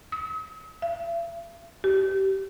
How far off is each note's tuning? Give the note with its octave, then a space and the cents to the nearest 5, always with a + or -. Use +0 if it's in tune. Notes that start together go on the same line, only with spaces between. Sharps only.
D#6 +45
E5 +45
G4 -25